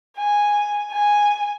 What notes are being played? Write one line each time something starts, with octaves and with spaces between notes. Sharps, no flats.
G#5
G#5